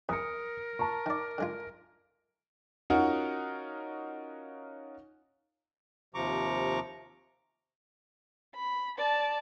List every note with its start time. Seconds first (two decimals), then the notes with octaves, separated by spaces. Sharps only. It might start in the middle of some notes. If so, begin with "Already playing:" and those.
0.09 E2 A#4 D#6 C#7
0.79 A5 A#5 C#6
1.06 D#3 D5
1.38 D3 G#3 F4
2.90 C#4 D#4 F4 F#4 A#4 F#5
6.15 D#2 C3 F3 A#5 C#6 D6
8.55 B5
8.97 D5 A5